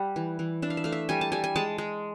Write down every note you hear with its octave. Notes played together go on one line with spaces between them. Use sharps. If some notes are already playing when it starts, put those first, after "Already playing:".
Already playing: G3 F#5
E3
E3
D4 E5
F5
E5
A3 F5
E5
G3 G#5
A5
G3 G#5
G#5
G#3 A5
G#3